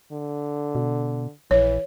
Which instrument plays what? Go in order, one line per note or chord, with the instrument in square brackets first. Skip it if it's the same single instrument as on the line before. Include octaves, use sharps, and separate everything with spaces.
[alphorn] D3
[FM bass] B2
[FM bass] A#1 [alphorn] E3 [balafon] C#5